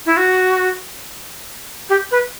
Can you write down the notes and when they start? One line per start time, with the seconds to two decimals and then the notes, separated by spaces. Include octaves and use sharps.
0.05 E4
0.16 F#4
1.89 G4
2.11 B4